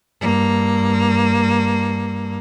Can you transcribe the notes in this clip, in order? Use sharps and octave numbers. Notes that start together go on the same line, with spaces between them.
G2 A#3